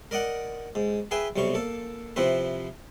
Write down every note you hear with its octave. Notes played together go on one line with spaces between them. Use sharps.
A#4 D5 D#5 F#5
G#2
G#4 B4 E5 G5 G#5
B1 C3 G3 C#6
A#3 A4
C3 F3 C4 E4 B4